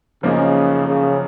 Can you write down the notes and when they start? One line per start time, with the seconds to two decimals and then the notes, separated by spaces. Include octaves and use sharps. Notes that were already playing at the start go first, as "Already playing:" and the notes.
0.23 F#2 C#3 F3 A#3 D#4
0.87 C#3